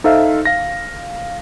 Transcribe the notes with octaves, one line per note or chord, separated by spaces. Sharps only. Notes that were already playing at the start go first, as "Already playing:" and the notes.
D#4 A4 C5 E5 F5
F5 A#6